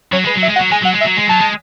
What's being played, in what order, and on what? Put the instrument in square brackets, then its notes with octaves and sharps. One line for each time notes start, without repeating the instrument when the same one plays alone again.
[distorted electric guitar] F#3 [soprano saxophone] C#5
[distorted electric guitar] G#3 [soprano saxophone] B4
[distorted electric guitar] F#3
[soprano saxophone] E5
[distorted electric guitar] G#3
[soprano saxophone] F#5
[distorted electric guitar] F#3
[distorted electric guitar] G#3 [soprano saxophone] G#5
[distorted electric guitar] F#3 [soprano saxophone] F#5
[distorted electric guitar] G#3
[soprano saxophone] E5
[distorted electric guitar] F#3
G#3
[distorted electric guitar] F#3 [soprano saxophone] A5
[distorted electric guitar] G#3